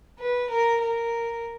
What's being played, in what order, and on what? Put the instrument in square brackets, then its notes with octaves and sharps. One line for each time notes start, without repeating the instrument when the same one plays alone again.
[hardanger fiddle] B4
A#4
A#4